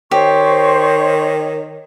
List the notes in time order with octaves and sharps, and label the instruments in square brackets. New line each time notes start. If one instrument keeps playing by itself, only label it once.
[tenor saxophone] D#3 [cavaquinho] G4 [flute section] C5 C#6 [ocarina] C#5